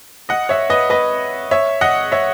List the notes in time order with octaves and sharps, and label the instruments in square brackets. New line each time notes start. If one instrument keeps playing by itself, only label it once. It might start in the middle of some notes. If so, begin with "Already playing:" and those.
[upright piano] D#5 F#5
C#5 E5
B4 D#5
B4 D#5
C#5 E5
D#5 F#5
C#5 E5